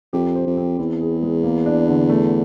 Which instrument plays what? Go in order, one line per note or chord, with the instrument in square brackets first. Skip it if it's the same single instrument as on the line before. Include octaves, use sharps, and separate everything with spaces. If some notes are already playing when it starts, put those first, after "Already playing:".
[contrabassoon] F2 [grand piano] G4
[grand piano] C5
[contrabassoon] F2
[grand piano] C4
[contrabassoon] E2 [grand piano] E4
[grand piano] G#4
G#3
A#3
D4
D3
A3